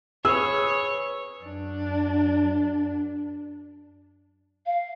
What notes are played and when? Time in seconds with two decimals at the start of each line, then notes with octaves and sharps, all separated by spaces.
0.25 G#4 B4 C#5 E6
1.45 F#2 D4
4.66 F5